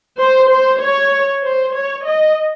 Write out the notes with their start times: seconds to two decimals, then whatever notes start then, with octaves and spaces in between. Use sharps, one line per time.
0.19 C5
0.50 C5
0.81 C#5
1.44 C5
1.74 C#5
2.06 D#5